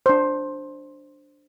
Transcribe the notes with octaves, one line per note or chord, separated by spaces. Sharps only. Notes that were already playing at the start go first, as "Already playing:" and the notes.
D4 C5